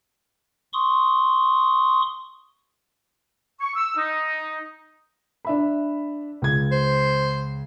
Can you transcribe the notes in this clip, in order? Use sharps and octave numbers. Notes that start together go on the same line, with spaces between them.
C6 C#6 D#6
C#6
E6
D#4
D4 E5 B5
C#2 G#6
C5